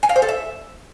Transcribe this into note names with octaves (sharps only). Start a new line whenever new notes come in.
G#5
F5
C5
A4
E5